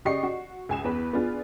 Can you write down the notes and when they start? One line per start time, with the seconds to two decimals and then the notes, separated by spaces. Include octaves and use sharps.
0.05 C#3 G4 D5 D#5 C#6 C7
0.23 F#4
0.69 C#2 G#5 E7
0.84 E2 B4
1.13 B3 D4 F4 G#4